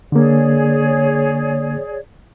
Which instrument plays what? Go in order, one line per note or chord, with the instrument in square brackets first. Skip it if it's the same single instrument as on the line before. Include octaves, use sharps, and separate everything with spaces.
[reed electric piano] D3 A#3 [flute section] G#4 C#5 D5